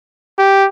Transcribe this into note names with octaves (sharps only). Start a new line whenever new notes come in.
G4